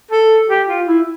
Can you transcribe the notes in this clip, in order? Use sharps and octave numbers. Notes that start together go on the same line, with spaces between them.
A4
G4
F4
E4